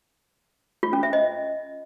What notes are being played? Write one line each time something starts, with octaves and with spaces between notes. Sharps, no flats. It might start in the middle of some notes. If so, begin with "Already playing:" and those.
F4
C#4
E5
D#5